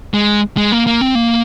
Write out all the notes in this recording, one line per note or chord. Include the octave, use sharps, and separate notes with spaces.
G#3
G#3
A#3
A#3
C4
A#3